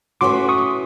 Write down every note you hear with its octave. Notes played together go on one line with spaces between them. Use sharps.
E3 A3 C#4 F#4 C6 D6
C#6 D#6